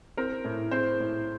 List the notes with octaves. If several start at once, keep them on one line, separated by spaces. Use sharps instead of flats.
C4 A#4
A2
C4 C5
A2